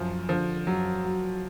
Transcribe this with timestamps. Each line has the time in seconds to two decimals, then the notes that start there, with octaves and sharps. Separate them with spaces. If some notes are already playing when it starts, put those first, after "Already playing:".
Already playing: F#2 F3
0.29 D3 F3
0.67 F#2 F#3
1.04 F#3